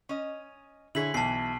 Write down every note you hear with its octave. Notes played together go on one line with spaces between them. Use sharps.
C#4 D#5
D3 E4 G#4 C#5 B6 F#7
B1 B2 E3 A5 C7